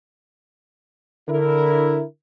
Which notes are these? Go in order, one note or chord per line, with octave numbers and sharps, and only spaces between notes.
D3 E4 A#4